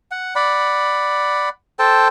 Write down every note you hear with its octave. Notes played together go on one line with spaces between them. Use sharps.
F#5
D5 F#5 B5
A4 C5 G5 A5